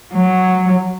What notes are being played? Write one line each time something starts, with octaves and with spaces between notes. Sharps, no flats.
F#3